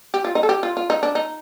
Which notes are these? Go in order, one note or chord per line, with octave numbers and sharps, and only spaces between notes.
G4
F4
D#4
A4
G4
F4
F4
D#4
D4
D#4